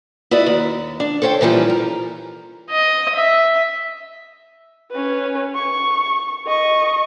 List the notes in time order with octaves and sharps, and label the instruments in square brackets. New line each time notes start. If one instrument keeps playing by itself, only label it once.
[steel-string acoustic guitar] E4 F#4 B4 D5 D#5
D#2
D4
A4 C5 C#5 E5 G5
A#2 E3 F3 G3 C#4
A#4
[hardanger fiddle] D#5
E5
[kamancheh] C#4 B4
C#6
D#5 C#6